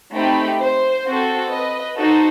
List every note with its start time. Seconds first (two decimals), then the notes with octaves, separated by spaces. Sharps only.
0.15 A3 C4 D#4 G4 G5 B5
0.61 C5
1.06 C4 F#4 A4
1.52 B4 D#5
1.98 D#4 F#4 A4 C5